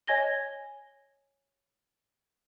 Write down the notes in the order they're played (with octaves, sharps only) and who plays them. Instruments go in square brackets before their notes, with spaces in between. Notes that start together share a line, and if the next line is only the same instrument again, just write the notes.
[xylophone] C#5 D#5 G#5 G#6 A#6 G7